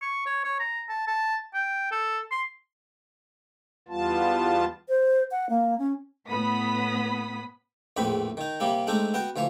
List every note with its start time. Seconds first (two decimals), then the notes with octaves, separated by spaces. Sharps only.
0.02 C#6
0.26 C#5
0.44 C#5
0.60 A#5
0.89 A5
1.07 A5
1.54 G5
1.91 A4
2.31 C6
3.88 E2 G3 B3 F4 A5
4.88 C5
5.31 F#5
5.49 A#3
5.78 C#4
6.29 A2 B3 B5 D#6 B6
7.97 A#1 E2 A2 C4 B5
8.37 D#3 D#4
8.60 C3 G3 A#3 C4
8.87 G#3 A3 C4 D4 D#4
9.14 B3 F#4 G5
9.36 D2 E3 F3 C#5